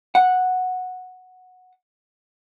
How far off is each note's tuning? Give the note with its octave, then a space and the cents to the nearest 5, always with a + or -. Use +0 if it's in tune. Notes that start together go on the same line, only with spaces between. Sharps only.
F#5 -5